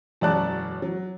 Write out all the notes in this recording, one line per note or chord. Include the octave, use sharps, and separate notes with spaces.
E1 F#2 C#4 D5 A5 F#6
F#3